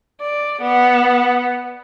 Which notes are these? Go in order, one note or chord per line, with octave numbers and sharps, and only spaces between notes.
D5
B3